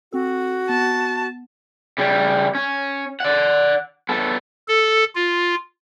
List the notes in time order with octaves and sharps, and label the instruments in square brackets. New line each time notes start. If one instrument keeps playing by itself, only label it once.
[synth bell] C4 A4 [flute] F#4
[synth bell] B3 [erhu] A5
[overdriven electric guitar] C#3 G3
C#4
D5 F#5
B3 A4
[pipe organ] A4
F4